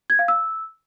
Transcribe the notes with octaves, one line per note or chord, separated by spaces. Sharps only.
G#6
F5
E6